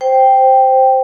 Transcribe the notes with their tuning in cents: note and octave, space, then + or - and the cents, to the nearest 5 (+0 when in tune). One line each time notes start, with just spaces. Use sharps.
C5 +0 G5 +0